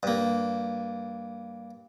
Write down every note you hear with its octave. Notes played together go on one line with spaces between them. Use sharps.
G2 A#3